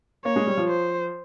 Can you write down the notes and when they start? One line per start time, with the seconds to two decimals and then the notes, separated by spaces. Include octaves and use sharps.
0.25 A#3 C#5
0.36 G#3
0.47 G3
0.57 F3
0.68 C5